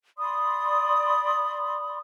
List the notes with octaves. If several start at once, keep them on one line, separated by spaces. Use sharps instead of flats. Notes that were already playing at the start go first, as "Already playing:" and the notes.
D5 B5 C6 D#6